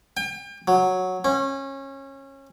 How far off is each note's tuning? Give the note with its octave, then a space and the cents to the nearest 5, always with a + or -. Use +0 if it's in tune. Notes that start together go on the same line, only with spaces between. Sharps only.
G5 +35
F#3 -5
C#4 -25